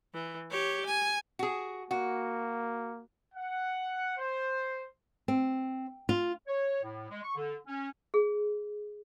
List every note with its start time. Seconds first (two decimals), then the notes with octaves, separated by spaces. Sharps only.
0.14 E3
0.51 G4 C#5
0.85 G#5
1.39 F#4 G#4
1.91 A#3 F#4
3.34 F#5
4.16 C5
5.28 C4
6.09 F4
6.47 C#5
6.83 A2
7.09 G#3
7.23 C#6
7.36 D3
7.68 C#4
8.14 G#4